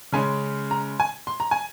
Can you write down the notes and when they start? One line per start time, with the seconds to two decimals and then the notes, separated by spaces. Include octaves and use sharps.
0.12 C#3 G#3 C#4 G#5
0.71 A#5
1.00 G#5
1.27 C6
1.40 A#5
1.51 G#5